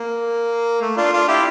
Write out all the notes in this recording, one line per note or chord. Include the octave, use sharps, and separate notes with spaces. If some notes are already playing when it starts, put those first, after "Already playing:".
Already playing: A#3
A3
D4 F4
D4 F4
E4 G4